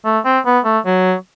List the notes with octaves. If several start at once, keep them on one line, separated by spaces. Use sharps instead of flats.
A3
C4
B3
A3
F#3